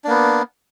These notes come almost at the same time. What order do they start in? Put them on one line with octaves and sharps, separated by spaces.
D4 A#3 B3